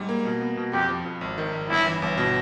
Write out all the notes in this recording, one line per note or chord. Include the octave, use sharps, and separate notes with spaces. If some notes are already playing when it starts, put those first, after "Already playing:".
Already playing: G#2 G3
A#3
B2
B3
B2
F2 G4
F3
F2
G#1
D#3
G#1
G1 E4
E3
G1
B2